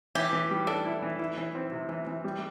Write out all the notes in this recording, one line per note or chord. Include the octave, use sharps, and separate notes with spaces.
E3 G4
E3
G3
D4 A4
E4
E3
E4
E3
C4
C3
E3
E3
G3